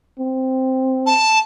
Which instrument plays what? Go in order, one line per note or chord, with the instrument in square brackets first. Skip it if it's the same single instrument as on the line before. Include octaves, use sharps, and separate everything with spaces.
[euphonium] C4
[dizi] A5